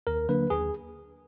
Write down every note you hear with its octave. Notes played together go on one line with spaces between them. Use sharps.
D#2 A#4
D3 F#3 A#3 D4 B4
D#2 G#4